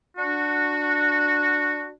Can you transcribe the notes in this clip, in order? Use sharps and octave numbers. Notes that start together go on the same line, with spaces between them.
D4 F#4